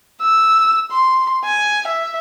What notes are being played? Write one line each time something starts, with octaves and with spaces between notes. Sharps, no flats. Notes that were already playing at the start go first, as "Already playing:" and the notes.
E6
C6
G#5
E5